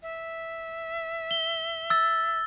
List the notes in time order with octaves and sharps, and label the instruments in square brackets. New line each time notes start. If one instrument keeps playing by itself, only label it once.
[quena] E5
[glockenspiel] G7
E6 A6